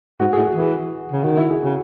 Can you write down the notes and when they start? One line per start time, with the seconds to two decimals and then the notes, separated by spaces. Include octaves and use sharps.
0.20 G#2 F#4
0.33 A2 G#4
0.47 F#4
0.55 E3 G#4
1.12 C#3
1.24 D#3 F#4
1.37 E4
1.50 G#4
1.63 C#3 F#4